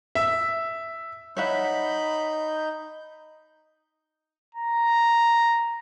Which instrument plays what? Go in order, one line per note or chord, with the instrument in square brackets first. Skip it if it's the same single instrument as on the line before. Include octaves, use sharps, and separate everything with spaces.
[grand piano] E5
[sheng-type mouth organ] D#4 G6 [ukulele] C#5 E5 F#5 [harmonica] B5
[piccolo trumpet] A#5